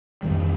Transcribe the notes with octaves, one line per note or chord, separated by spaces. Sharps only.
F2 D#3 G3